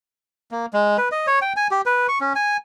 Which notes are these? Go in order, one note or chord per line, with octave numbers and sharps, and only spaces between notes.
A#3
G#3
B4
D#5
C#5
G5
G#5
G4
B4
C#6
C#4
G#5